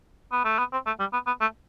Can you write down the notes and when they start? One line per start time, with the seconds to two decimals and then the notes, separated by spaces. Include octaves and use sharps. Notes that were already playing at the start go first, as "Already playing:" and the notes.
0.32 B3
0.45 A3
0.59 B3
0.73 C4
0.87 A3
1.00 G3
1.13 B3
1.27 B3
1.41 A3